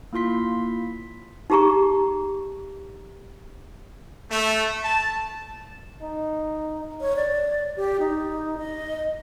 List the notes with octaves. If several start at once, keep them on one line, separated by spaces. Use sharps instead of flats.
A#3 E4 F4 C6 B6
D#4 G4 G#4 A#5 C#6
A3
A5
D#4
C#5
D5
G4
D#4
D#5